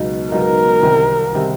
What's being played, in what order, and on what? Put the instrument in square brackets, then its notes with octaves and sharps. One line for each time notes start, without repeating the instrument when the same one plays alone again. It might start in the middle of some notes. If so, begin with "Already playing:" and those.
Already playing: [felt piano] C#2 B2 F#3 B3 D#4
[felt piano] C#2 B2 F#3 B3 D#4 [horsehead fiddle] A#4
[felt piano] C2 C3 D#3 G3 C4
C3 D#3 G3 C4